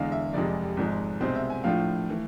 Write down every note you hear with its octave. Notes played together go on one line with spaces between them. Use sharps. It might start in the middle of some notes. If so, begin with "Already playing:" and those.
Already playing: E2 D3 G#3 F5
E5
F1 F2 C3 G#3 D5
G#1 G#2 F3 G#3
C2 B2 G#3 C4 C5
E5
G#5
A2 F3 A3 D4 F4 F5
E3 A3